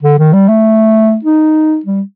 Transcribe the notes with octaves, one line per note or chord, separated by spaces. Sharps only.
D3
D#3
G3
A3
D#4
G3